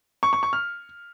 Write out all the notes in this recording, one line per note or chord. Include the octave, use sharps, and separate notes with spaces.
C#6
C#6
C#6
F6